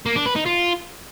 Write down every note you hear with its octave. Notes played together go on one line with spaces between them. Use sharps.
A#3
D4
B4
D#4
F4